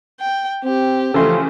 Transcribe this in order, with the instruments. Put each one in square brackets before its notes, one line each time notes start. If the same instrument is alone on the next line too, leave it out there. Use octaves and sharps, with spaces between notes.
[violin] G5
[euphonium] C4 [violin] G4
[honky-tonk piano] C#3 E3 A3 [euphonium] F3 [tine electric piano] A4 C6